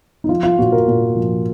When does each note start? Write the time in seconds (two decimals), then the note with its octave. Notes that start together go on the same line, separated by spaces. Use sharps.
0.24 D#4
0.29 F3 F4
0.43 F4
0.58 A#2 F#4
0.72 A#4
0.88 A#2
1.16 F3